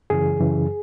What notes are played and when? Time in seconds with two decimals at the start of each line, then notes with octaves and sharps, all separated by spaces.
0.10 F#2 C#3 E3 G#4
0.39 F#2 C#3 E3